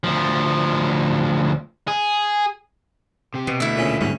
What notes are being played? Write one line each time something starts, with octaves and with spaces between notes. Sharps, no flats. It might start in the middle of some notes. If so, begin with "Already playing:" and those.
D2 F3
G#4
C3 G4
B2 B3
D3 A3 E4 E5
A#2 C#3 C#4
G#2 B2 G3 C#4